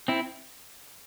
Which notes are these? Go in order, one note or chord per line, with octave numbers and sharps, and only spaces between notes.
C4 E4